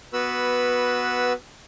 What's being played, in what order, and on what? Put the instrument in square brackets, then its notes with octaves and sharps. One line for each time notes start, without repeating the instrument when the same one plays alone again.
[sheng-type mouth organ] B3 F#4 B4 B5 E6